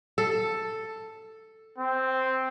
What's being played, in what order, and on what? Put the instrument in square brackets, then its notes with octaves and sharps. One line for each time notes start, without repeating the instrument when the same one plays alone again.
[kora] A4
[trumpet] C4